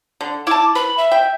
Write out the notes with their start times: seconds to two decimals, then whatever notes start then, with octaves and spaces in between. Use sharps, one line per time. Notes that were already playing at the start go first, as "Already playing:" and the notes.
0.21 D3
0.47 E4 A5 D6
0.75 B4 B5
0.98 E5
1.12 G5